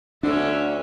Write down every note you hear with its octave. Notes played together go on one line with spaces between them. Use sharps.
D2 D3 C#4 D4 E5